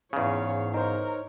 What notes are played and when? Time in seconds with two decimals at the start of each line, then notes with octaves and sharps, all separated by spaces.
0.13 E2 G#2 C#3 C#5 F5
0.74 D#4 A#4 C5 C#5